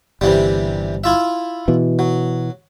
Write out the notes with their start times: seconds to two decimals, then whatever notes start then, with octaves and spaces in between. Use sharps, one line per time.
0.21 G1 C3 E3 G3
1.04 E4 F4 E5
1.68 B2 E3
1.99 F#3